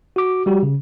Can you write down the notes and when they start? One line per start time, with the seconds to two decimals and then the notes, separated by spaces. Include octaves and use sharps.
0.16 F#4 D6
0.46 G3 F#4 G4
0.63 C#3